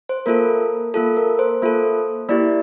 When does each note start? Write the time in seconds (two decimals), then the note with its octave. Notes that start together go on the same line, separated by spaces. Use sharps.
0.09 C5
0.26 A#3 F4 A4 A#4
0.94 A#3 F4 A4
1.17 A#4
1.39 C5
1.62 A#3 F4 A4
2.29 A#3 E4 G4 D5